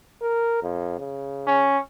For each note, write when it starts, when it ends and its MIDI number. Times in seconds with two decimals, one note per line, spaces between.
0.22 0.60 70
0.62 0.96 41
0.99 1.67 49
1.47 1.79 61